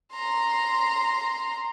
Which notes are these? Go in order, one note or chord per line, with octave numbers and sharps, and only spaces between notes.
A#5 C6